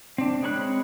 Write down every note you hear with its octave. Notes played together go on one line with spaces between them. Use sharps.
C4 D4
G#3 C4 C#5 B5 F#6